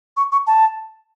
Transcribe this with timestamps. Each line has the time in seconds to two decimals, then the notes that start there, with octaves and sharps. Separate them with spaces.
0.17 C#6
0.32 C#6
0.47 A5